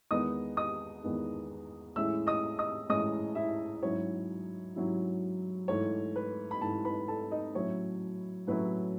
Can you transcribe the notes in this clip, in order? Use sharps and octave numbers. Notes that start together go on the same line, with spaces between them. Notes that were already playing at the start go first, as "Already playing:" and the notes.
E2 D#3 G#3 B3 D#4 D#5 D#6
D#5 D#6
E2 D#3 G#3 B3 D#4
A2 E3 G#3 C#4 E5 E6
D#5 D#6
D#5 D#6
A2 E3 G#3 C#4 D#5 D#6
E4 E5
G#2 F#3 C#4 E4 C#5
G#2 F#3 C#4 E4
G#2 E3 A3 C#5
B4
B5
G#2 E3 A3 A4 A5
B4 B5
A4 A5
D#4 D#5
A2 F#3 C#4 E4 C#5
A2 F#3 C#4 E4 B4